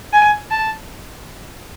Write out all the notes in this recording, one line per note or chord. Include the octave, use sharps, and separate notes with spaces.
G#5
A5